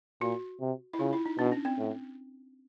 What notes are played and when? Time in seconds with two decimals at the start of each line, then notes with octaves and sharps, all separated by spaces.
0.21 A#2 F#4
0.60 C3
0.93 E4
0.99 C#3 F4
1.13 E4
1.26 D#4
1.39 B2 D4
1.52 C#4
1.65 C4
1.78 A2